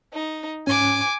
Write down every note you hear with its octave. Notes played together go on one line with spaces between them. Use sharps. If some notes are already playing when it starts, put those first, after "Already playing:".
D#4
G#2 C#4 G#5 D6